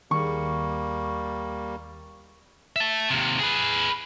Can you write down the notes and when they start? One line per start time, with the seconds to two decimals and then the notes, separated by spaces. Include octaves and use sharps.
0.11 D#2 G3 A#3 C#6
2.76 E5 A5
3.11 D#2 C3
3.39 G#4 B4